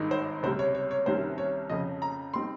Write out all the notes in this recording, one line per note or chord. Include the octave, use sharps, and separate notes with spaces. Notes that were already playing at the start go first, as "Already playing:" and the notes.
Already playing: G#1 G2 D#3 G#3 D#4
C5
C#2 C3 G3 C5
C#5
C#5
C#5
C2 C3 D#3 G3 C#4 C5
C#5
F2 C#3 F3 D#5
A#5
G3 C4 D#4 C6